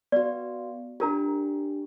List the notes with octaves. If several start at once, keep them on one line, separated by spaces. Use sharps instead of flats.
B3 F#4 D5
D4 F4 G4 A#4 A#5